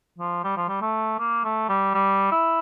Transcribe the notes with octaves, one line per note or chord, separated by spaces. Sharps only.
F3
G3
F3
G3
A3
A#3
A3
G3
G3
E4